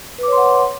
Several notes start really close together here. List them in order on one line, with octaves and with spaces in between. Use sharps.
B4 D6 C#5 C6 F#5